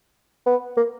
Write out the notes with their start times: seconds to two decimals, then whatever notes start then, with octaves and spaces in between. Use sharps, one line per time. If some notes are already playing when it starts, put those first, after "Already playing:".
0.46 B3
0.77 A#3